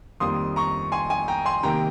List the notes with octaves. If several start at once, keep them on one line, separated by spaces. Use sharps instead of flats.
F2 D#3 G3 A#3 C6 D#6
A#5 C#6
G#5 C6
G#5
G5 A#5
G#5 C6
C3 D#3 A#3 G5 A#5